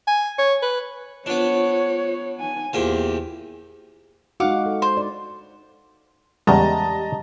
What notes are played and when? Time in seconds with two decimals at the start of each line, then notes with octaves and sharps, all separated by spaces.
0.08 G#5
0.38 C#5
0.62 B4
1.26 B3 D4 F4 C5 C#5
2.40 D#4 G#5
2.73 E2 A#2 E4 G4 C5
4.40 G#3 D#4 F#4 F5 F#5 D6
4.66 A4
4.82 C5
4.97 D5
6.47 E2 C#3 G3 G#3 D#5 A5 A#5